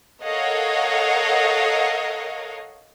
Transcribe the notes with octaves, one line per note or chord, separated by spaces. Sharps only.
A4 A#4 C#5 D#5 F5 F#5